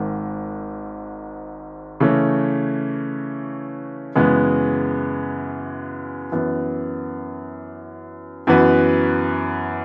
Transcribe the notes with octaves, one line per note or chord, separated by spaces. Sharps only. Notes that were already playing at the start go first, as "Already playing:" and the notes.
Already playing: G#1 G#2 D#3
C#3 E3 A3 C#4
F#2 C#3 E3 G#3 B3
F#2 E3 B3
F#2 E3 B3 F#4 B4